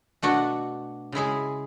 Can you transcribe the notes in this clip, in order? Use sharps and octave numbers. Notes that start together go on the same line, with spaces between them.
B2 A3 D4 F#4
C#3 G#3 E4 G#4